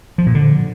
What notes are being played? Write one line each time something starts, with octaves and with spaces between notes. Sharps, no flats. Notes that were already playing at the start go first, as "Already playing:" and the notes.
F3
A#2
D3